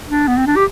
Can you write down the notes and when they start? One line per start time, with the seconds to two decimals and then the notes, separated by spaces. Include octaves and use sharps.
0.09 D4
0.28 B3
0.37 C4
0.46 D4
0.56 G4